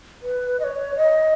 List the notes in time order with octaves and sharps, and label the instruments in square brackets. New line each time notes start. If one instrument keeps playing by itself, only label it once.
[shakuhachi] B4
D#5
C#5
D#5